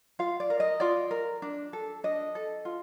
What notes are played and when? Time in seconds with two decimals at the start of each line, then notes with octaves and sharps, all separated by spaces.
0.19 F4 F5
0.40 D5
0.50 A#4
0.60 D#5
0.80 F4 D5
1.11 A#4
1.42 D4
1.73 A4
2.04 D4 D#5
2.35 A4
2.65 F4